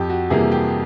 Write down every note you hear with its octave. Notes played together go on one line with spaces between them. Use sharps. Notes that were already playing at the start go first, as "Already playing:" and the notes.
Already playing: F2 G4
F#4
C3 E3 G3 A#3 G#4
G4